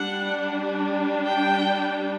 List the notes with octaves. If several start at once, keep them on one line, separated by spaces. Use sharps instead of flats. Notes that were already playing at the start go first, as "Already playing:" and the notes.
Already playing: G3 D4 F#5
G5